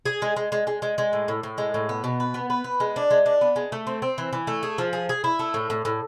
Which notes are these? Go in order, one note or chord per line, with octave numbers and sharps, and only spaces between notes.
G#4
G#3
G#3
G#3
G#3
G#3
G#3
A2
A2
A2
G#3
A2
B3
B2
B4
B3
B4
B3
G#3
D4
G#3
D4
B3
G#3
A3
C4
C4
E3
E3
A3
G#4
F3
G#4
G#4
E4
A3
A2
A2
A2